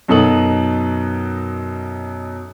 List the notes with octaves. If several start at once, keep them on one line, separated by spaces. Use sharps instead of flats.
F#2 B2 D#4 A4 D#6 F#7